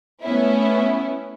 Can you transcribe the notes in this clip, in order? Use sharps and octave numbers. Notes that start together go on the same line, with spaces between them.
A3 B3 C#4 E4